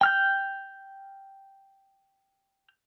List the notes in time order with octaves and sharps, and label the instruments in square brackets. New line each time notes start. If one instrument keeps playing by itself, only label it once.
[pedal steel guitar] G5 F6 G6